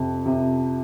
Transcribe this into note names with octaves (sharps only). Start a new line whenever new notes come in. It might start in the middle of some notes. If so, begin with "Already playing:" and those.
Already playing: F2 C3
C3